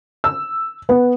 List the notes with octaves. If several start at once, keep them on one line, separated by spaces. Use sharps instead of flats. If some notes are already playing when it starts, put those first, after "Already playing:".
E6
B3